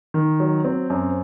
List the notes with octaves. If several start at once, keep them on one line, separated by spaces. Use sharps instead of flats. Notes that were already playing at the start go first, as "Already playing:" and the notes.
D#3
F#3
C4
F#2